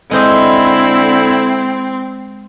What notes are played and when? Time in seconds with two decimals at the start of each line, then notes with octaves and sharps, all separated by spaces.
0.11 D3 G#3 C4 E4 C5 D#5